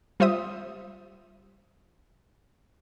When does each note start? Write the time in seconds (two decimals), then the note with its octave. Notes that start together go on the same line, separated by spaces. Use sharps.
0.20 G3 F4 C5 E5 D#6